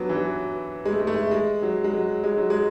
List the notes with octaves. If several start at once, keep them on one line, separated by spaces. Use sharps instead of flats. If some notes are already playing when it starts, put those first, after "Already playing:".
Already playing: F#3 B3 D4
E3
F#3
G#3
A3
G#3
A3
G#3
G#3
F#3
G#3
F#3
G#3
F#3
G#3